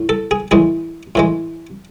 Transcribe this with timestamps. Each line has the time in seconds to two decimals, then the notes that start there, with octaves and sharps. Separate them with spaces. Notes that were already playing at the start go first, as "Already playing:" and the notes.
Already playing: A2
0.09 A4
0.31 G#4
0.51 A2 E3 G#3 G#4
1.15 A2 E3 G#3